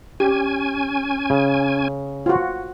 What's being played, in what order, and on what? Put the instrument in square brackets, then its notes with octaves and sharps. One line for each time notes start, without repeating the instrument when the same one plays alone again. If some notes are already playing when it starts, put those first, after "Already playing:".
[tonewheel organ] C#4 G#5 [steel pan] G4
[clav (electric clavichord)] C#3
[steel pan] F4 F#4